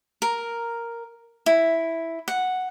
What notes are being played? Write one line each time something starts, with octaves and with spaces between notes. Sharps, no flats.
A#4
E4
F#5